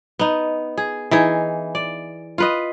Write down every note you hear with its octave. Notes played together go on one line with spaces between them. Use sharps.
B3 D#4
G#4
E3 D#4 G#4
D5
F4 B4 D#5